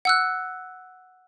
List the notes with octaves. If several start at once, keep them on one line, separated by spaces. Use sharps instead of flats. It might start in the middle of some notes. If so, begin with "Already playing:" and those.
F#5 E6 F#6